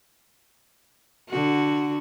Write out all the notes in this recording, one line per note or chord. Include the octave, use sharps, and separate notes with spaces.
D3 F#4